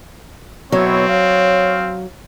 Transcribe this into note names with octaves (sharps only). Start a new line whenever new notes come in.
B2 F#3 B3 C4 E4 C#5
C#5 F5